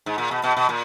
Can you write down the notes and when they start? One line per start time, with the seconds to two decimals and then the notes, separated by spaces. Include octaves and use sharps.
0.06 G#2
0.18 A#2
0.31 B2
0.44 B2
0.57 B2
0.69 A#2